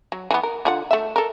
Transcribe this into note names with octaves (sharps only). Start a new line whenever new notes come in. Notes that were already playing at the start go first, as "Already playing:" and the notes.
F#3
E3 A#3 B3
A#4
D3 F4 F#5
A3 E5
A4 A#4